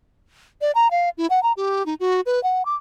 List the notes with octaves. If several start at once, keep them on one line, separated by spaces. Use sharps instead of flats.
D5
A#5
F5
E4
F#5
A#5
G4
D#4
F#4
B4
F#5
D6